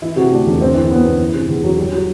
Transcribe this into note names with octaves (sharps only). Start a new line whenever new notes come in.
E3 E4
C3 F#4
D2 D4
E1
G1 C4
E3
F#2 B3
G1
E3
C3
E2
E1 F#3
D3 G3
F#3